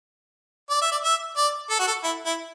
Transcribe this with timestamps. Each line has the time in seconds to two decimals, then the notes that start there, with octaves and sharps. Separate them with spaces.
0.70 D5
0.81 E5
0.91 D5
1.04 E5
1.37 D5
1.70 A4
1.79 F#4
1.87 A4
2.04 E4
2.26 E4